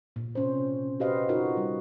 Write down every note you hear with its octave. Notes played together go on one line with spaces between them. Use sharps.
A#2
C3 C#4 C5
F#4 G4 B4 C5 D#5 F5
D#4 F4 F#4 A#4
G3